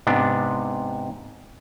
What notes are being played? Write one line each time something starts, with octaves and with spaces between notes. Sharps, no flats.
G#2 C3 B3 D4